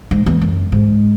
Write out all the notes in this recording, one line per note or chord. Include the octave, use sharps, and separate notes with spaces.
G#2
E2
F#2
G#2